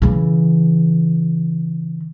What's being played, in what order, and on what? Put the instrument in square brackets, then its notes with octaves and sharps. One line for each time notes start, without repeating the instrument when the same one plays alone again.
[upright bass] C#3 E3